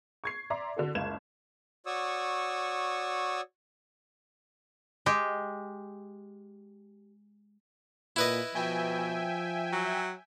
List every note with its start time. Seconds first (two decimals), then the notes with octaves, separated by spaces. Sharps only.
0.24 C#6 G#6 C7
0.50 D5 E5 A#5 C6 D6
0.77 D3 F#4 A4
0.95 F#1 C#2 F5 G#6 E7
1.86 F#4 C#5 D5 C#6 D#6 E6
5.06 G#3 G4
8.16 A#2 E4 B4 D#5
8.55 B2 F3 E5 G5 G#5
9.72 F#3